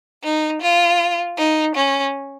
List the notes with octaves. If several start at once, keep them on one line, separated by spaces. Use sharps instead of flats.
D#4
F4
D#4
C#4